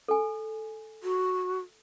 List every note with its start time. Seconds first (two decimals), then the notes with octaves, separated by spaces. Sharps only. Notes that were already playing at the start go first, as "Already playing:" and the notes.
0.08 A4 G#5
1.03 F#4